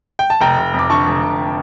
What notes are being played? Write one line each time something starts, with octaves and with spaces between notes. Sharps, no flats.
G5
A5
F1 G5 A#5
F1
F2
D6
D3 A5 C#6
F1
F1